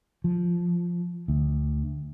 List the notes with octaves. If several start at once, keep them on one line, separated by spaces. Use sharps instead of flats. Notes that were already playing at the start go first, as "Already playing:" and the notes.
F3
D2